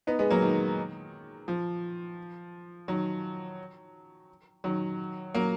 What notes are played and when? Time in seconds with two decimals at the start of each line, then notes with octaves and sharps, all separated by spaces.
0.07 B3 D#4
0.19 G#3 B3
0.30 F#3 A#3
0.42 D#3
1.48 F3
2.88 D#3 F#3
4.64 D#3 F#3
5.34 F#3 A#3